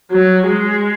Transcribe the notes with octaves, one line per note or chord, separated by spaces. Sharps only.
F#3
G#3